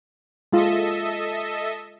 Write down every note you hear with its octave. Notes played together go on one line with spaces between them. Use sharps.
G#3 F4 A4 D#5 E5